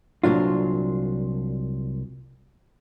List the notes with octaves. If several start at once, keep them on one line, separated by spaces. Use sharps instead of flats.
C2 A#2 F#3 D4 F4